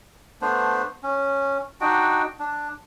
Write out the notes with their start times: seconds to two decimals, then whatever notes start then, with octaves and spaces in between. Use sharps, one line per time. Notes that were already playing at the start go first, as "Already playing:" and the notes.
0.42 A3 B3 D4 C5
1.03 C#4
1.81 D4 D#4 F#4 G5
2.39 D4